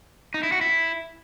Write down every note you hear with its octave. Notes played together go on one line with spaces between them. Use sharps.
D#4
E4
F#4
E4